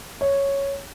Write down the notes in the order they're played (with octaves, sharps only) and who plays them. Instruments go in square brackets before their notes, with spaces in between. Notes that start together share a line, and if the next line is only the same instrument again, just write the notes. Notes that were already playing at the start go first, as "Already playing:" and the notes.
[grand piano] C#5